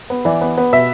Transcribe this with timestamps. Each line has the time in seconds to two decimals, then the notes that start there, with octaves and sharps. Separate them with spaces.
0.10 B3
0.25 E3 D5
0.41 B3
0.57 B3
0.72 B2 E5